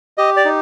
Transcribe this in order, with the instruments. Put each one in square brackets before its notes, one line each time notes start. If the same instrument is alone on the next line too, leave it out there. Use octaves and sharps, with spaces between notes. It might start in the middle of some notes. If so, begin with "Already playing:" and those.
[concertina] G4 D#5
D5
D#4